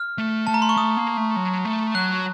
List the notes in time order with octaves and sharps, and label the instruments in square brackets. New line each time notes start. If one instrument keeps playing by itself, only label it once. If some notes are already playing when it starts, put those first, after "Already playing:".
Already playing: [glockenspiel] F6
[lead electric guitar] A3
[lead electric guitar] A3 [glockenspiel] A5
[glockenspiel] A#5
C6
C#6
[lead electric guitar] A3 [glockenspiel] D#6
[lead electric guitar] A#3
A3
F#3
A3
[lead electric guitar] F#3 [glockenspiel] F#6